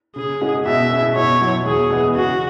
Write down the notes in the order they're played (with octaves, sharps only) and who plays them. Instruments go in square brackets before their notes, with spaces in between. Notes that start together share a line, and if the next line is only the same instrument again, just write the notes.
[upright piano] C#3 [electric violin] G#4
[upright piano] G#3 C#4 F#4
[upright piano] B2 [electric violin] E5
[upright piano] G#3 C#4 E4
[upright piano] B2 [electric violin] C#5
[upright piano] F#3 E4
[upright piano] E2 [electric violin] G#4
[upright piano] E3 G#3 B3
[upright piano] C#3 [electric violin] F#4